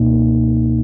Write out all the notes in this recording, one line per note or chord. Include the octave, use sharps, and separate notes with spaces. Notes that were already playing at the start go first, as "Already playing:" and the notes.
Already playing: C#2 B2 A#3 D#4